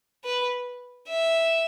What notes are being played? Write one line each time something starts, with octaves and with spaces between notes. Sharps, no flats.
B4
E5